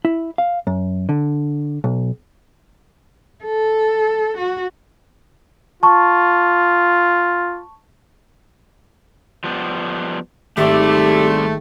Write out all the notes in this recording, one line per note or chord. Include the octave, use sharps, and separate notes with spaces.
E4
F5
F#2
D3
B1
A4
F#4
F4 A5 C#6
F3 G3 B3
G#1 G3 A3 C4 G4 D5